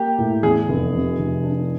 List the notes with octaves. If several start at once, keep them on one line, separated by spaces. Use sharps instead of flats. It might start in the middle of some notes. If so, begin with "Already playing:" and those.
Already playing: A#3 G4
A2
E2 G#4
F1
C3
F1
D4